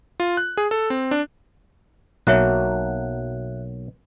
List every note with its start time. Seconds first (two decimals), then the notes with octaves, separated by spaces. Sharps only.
0.20 F4
0.37 F#6
0.57 G#4
0.71 A4
0.90 C4
1.11 D4
2.27 B1 F#3 A#3 C#5 E5 F#6